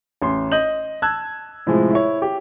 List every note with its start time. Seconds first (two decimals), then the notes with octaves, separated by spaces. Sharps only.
0.22 A1 C6
0.52 D#5 G6 F#7
1.02 A5 E6 F#6 G#6
1.67 A2 C3 F3 G#3
1.91 E4 C#5
2.22 G4